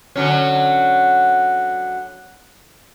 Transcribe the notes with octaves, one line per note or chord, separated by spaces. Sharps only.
D3 F#3 C#4